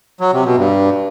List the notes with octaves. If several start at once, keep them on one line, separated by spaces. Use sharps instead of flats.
F#3
C3
B2
G2